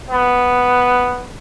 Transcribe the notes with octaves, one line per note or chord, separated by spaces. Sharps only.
B3